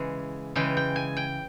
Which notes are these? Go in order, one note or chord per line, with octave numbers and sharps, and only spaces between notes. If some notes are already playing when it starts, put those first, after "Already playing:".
Already playing: C#3 E3 G#3
C#3 E3 G#3 G5
G5
G#5
G5